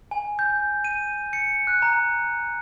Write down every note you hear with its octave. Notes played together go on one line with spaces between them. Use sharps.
G#5
G6
D#7
C#7
F#6
A#5